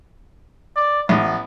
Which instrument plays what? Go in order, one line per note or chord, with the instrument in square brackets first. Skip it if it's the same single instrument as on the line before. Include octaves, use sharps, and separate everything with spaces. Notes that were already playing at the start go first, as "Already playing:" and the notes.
[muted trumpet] D5
[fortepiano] A1 [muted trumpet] B3